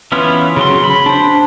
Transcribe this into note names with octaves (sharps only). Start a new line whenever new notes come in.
E3 B3 C#4 E4 F4
C#3 F#3 C6
B5
D4 C5